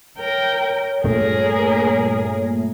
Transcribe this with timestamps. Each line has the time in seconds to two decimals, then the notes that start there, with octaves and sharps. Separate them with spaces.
0.18 A#4 C#5 G5
1.04 G2 A#2 A3 G#4 A#4